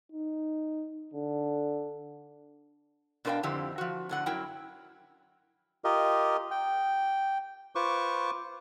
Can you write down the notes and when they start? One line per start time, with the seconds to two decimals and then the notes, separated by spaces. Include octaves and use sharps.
0.12 D#4
1.14 D3
3.25 B2 D4 A#4 B4 F5 G5
3.43 F2 D3 C4 E4 G4 C5
3.78 F3 F#4
4.09 A2 D3 F#5
4.26 F#2 F#3 E4 A#4 G5
5.84 F4 G4 A#4 D#5
6.51 G5
7.75 F4 B4 C5 C#6 D6